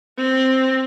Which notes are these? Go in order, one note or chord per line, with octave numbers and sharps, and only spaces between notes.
C4